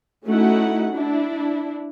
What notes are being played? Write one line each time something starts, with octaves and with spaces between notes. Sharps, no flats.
A3 C#4 D#4 E4 F#4 F#5
D4 E4